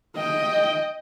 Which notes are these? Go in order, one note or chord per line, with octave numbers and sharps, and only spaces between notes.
D#5 G5